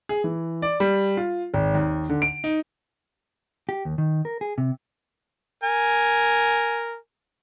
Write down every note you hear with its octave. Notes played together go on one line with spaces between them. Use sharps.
G#4
E3
D5
G3
F4
G#1
D#2
D3
D7
D#4
G4
D#2
D#3
A#4
G#4
C3
A#4 G#5